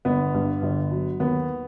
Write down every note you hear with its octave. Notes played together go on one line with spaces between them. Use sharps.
G1 B3
G2
G1
F#3
D#2 B3